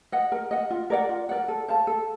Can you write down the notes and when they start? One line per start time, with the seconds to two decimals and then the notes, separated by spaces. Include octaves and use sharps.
0.12 D#5 F#5
0.32 A#4
0.51 D#5 F#5
0.70 F4
0.90 A#4 D5 F#5
1.09 F4
1.29 A#4 D5 F#5
1.48 A4
1.68 C5 F5 A5
1.87 A4